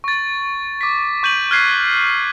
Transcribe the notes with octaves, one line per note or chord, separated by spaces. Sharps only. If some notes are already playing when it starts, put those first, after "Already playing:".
C#6 A6
D6 B6
C#6 G6 D#7 F#7
F6 F#6 G#6 B6 C7